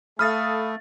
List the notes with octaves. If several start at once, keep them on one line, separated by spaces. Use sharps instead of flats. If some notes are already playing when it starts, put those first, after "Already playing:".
A3 A4 F5 B5 D#6 F6 A6